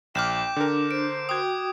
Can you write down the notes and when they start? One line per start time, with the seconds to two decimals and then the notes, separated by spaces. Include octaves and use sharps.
0.15 A#1 G5 D6 F6 G6 E7
0.56 D3 D4 A#4
0.91 C5 D7
1.29 F#4 G5 D#6 G#6